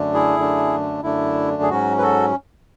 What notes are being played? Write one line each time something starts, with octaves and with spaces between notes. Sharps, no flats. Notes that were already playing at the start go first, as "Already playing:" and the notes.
Already playing: F#2 D3 A3 D4
E4 G#4
F#2 D3 A3 D4
F#2 D3 A3 D4 E4
G#4
G#2 F#3 C#4 F#4
B4
F#4 A4